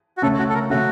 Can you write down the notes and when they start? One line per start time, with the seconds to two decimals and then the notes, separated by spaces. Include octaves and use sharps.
0.17 F#4
0.22 C#3 A3 C#4 A4
0.39 F#4
0.49 A4
0.54 A#4
0.69 C#3 A3 C#4 F#4